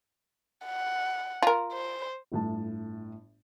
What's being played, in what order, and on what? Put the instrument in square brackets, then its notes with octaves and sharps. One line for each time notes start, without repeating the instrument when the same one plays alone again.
[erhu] F#5
[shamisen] F4 A#4
[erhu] C5
[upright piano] G1 A2 A5